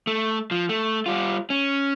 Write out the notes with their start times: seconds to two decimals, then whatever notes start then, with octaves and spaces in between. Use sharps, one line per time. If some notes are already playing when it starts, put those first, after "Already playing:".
0.07 A3
0.51 F3
0.69 A3
1.06 G3 F4
1.50 C#4